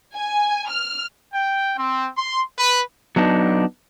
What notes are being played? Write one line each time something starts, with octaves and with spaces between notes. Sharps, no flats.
G#5
F6
G5
C4
C6
B4
F#3 B3 D4 D#4